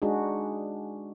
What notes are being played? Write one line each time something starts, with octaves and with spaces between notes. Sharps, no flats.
G#3 D4 D#4 F#4 G#4